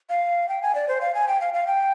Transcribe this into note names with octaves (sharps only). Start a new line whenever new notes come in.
F5
G5
G#5
D5
C5
F5
G#5
G5
F5
F5
G5